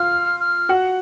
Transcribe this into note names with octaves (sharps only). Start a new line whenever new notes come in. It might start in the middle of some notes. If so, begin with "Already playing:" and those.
Already playing: F4 F5 F6
F6
F#4 F#5